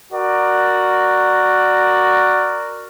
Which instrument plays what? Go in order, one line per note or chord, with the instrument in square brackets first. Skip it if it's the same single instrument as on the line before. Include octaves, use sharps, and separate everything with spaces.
[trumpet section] F#4 A#4 D5